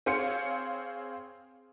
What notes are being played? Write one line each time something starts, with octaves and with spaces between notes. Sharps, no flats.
C4 G#4 C5 C#5 F5 C#7